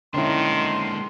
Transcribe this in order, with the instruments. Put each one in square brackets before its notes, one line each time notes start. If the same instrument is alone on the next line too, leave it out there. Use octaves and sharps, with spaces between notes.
[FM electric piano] D3 C#4 E4 [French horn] D#3 [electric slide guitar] G#3 A#3 D4 [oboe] C6